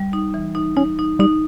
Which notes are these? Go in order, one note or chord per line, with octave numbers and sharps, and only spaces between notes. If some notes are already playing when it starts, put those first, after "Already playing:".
Already playing: G3
D#4
E3
D#4
C#4 D#4
D#4
G3 D#4